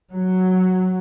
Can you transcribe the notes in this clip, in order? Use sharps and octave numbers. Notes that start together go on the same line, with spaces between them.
F#3